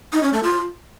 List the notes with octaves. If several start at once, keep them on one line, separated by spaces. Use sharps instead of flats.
D#4
C#4
A3
F4